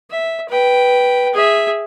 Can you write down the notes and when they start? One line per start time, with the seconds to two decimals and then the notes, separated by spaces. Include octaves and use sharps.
0.10 E5
0.49 B4 G5
1.34 G#4 E5